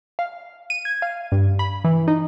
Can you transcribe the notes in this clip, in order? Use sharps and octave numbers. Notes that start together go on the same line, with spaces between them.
F5
D#7
G#6
F5
G2
B5
E3
D#4